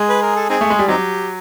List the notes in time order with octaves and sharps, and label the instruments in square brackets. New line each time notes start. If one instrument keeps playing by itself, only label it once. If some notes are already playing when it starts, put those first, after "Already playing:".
Already playing: [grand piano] G#3 [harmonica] G#4
[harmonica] B4
A#4
A4
C4 D#4 G#4
[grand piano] A3
G#3
G3
[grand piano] F#3 [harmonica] C4 D#4 G4